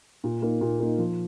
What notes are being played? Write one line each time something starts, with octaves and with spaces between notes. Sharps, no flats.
A#2
A#3 D#4
A#2
A#3 D#4
F3